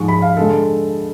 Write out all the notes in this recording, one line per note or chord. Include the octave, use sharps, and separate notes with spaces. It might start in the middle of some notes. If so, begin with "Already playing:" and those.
Already playing: G#2 F3 G#3 C#6
B5
F5
D3 G#3 A4